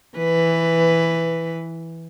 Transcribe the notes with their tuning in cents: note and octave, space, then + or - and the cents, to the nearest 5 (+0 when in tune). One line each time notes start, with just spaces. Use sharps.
E3 +0 B4 +10